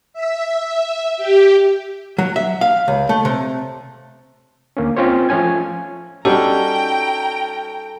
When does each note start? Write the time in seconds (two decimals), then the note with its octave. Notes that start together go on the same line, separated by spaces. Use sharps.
0.13 E5
1.17 G4
2.18 F#3
2.36 E5
2.61 F5
2.88 C#2
3.09 A3
3.25 C3
4.77 D2 A#3 C#4
4.97 C4 C#4 F4 C5 C#5
5.29 F3 A3 C#4 G#5 G#6
6.25 G3 C#4 D#4 F#4 G4 A4 G5 A#5